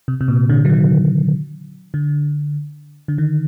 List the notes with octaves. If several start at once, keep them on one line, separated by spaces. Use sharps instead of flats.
C3
C3
A#2
D3
F#3
D#3
D3
D3
D#3